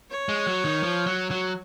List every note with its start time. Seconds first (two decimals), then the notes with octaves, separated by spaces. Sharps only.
0.10 C#5
0.29 G#3
0.47 F#3
0.65 D#3
0.83 F3
1.07 F#3
1.31 F#3